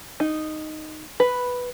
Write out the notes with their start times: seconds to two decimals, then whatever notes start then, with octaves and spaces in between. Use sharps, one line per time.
0.20 D#4
1.20 B4